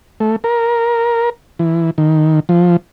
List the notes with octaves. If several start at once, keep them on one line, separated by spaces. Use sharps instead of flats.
A3
A#4
E3
D#3
F3